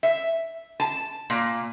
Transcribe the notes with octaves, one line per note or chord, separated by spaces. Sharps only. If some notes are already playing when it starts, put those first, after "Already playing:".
E5
A5
A#2